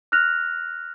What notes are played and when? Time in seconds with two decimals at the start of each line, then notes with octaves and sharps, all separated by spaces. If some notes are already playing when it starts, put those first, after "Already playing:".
0.12 F6 F#6 A#6 F7